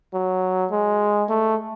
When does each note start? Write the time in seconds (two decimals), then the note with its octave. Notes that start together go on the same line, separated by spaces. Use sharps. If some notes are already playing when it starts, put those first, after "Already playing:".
0.14 F#3
0.71 G#3
1.29 A3